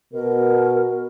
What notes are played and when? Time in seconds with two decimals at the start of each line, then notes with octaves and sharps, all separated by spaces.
0.13 B2 A#4